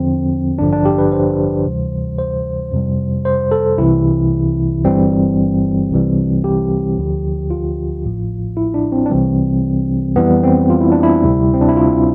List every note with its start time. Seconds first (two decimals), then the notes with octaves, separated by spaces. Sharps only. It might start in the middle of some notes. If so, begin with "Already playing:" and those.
Already playing: E2 D3 F3 C4
0.59 A1 G2 D3 F3 D4
0.72 D4
0.85 G4
0.98 B4
1.12 C5
1.66 D2 C3 E3 G3
2.18 C5
2.72 F2 C3 G3
3.25 C5
3.52 A4
3.78 C2 C3 E3 E4
4.85 G1 G2 E3 G3 C4
5.91 C2 C3 E3 G3
6.44 G4
6.97 D2 D3 F3
7.51 F4
8.04 A1 A2 F3
8.57 E4
8.74 D4
8.92 C4
9.06 D4
9.10 C2 C3 E3 G3 C4
10.16 F2 E3 G3 B3
10.43 C4
10.70 F4
10.81 E4
10.92 D4
11.03 E4
11.23 D2 C3 G3
11.54 C4
11.61 D4
11.69 E4
11.77 F4